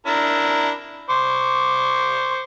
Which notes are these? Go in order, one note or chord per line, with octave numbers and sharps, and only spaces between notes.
D4 E4 A#4
C5 C#6 D6